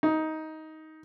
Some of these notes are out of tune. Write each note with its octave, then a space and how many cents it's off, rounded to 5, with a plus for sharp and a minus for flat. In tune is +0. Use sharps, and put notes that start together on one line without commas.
D#4 +15